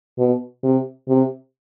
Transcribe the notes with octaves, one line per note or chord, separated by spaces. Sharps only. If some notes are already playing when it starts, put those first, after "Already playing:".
B2
C3
C3